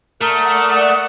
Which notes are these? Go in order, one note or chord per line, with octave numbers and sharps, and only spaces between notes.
A3 A#4 D5 F#5 D#6